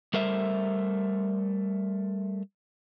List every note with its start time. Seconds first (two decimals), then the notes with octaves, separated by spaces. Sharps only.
0.14 G3 A3 A#4 C5 E5